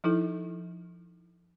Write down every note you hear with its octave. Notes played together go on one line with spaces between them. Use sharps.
F3 D#4 E4 A4